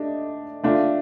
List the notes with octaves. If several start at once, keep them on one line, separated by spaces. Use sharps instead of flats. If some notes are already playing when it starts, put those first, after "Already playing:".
Already playing: A3 D4 G4 D#5
A3 D4 F4